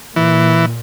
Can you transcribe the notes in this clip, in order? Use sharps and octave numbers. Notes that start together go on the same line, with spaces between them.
A#2 E3